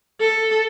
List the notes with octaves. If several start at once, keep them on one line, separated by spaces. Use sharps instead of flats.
A4